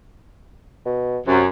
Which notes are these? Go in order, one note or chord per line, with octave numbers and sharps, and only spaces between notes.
B2
F#2 C3